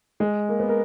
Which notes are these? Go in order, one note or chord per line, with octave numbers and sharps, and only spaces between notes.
G#3
A#3
B3
A#4